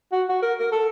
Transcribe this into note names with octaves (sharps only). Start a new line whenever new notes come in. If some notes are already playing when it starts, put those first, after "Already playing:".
F#4
F#4
A#4
A#4
A4